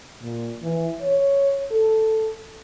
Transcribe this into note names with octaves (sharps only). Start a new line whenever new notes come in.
A#2
E3
C#5
A4